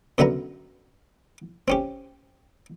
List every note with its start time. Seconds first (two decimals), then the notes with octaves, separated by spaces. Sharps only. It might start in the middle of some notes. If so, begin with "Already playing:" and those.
0.18 F#2 D3 B3 E5 A#5
1.68 C4 C#4 G4